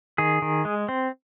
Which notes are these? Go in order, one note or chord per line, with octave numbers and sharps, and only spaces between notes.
D#3 G#4
D#3
G#3
C4